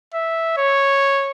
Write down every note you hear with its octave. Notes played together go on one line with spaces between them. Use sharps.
E5
C#5